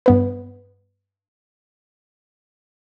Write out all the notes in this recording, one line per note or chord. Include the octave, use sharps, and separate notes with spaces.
G2 B3 B4